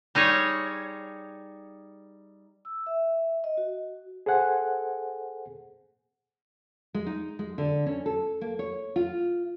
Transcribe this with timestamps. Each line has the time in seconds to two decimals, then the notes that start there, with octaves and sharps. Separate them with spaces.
0.15 G3 D#4 G#4 C#5
2.65 E6
2.86 E5
3.44 D#5
3.57 F#4
4.26 G#4 A4 C5 F#5 G#5
6.94 G#3
7.06 D#4
7.39 G#3
7.58 D3
7.86 C#4
8.06 A4
8.41 A#3
8.59 C#5
8.96 F4